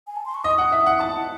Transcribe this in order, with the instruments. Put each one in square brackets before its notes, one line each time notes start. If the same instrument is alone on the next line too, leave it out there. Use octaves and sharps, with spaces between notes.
[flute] G#5
A5
C6
C#6
[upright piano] D#5 [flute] D#6
[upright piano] F#5
E5
F#5
[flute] F#5 [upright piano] A5